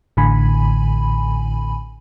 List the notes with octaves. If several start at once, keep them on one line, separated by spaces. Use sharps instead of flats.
A1 A2 D3 G#5 B5